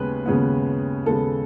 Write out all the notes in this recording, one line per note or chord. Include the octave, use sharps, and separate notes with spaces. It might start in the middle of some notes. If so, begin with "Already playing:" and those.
Already playing: D#2 C#3 G#3 B3 B4
D#2 C#3 G#3 B3
D#2 C#3 G#3 B3 A4